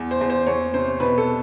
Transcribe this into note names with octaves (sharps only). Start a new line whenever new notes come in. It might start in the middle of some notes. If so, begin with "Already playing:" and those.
Already playing: E2
C5
E2
C5
E2 C#5
C3 C5
B2 B4
A4